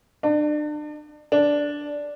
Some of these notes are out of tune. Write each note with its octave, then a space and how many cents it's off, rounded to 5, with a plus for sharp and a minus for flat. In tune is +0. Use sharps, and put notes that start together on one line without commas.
D4 +35
D4 -5